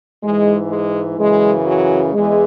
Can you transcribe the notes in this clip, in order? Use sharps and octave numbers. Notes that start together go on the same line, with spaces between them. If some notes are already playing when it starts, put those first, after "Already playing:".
G#2 E3 G#3
G#3
F#2 C#3 E3 G#3
F#3
E2 E3 G#3